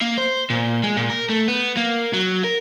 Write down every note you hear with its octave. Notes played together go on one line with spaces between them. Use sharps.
A#3
C5
A#2
G#3
A#2
A#4
A3
B3
A#3
F#3
A#4